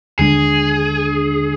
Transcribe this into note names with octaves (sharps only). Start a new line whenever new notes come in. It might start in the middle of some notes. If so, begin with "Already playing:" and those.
D#2 D3 G#3 D4 G#4